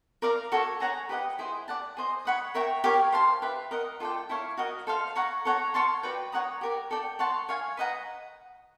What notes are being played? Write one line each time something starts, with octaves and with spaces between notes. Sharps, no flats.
A#4 D5 F5 A#5
F#4 A4 C#5
G#4 C#5 F#5 A#5
G4 B4 D#5 F#5
E4 G#4 C5
D5 F#5 A5
G#4 C5 D#5
C#5 F#5 B5 D#6
A#4 C#5 E5 G5
G4 A#4 C#5 F5
C5 F5 A5 C6
G4 B4 E5
A#4 D#5 F#5
F4 A4 D5 G5
E4 A4 C#5 F5
F#4 A#4 D#5
A4 C5 F5
C#5 F#5 A#5 C#6
A4 C#5 F#5 A#5
C#5 F5 A5 C6
F#4 B4 D5 G5
C#5 F#5 A#5 D#6
G4 A#4 D5
A4 D5 G5
C#5 F#5 A5 C6
C#5 F5 G#5
B4 D#5 F#5 A#5